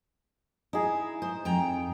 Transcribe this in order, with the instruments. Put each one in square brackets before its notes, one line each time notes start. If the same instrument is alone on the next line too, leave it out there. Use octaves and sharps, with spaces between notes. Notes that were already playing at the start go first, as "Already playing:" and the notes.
[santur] D#4 G#4 [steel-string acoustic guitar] E4
[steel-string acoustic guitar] C5
F2 G5 A#5